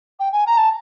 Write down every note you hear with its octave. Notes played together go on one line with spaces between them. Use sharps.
G5
G#5
A#5
A5